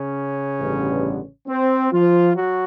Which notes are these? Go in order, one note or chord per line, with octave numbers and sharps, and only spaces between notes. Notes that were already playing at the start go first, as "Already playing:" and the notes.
Already playing: C#3 C#4
A1 G2 D3 G3 B3
C4
F3 F4
F#3 F#4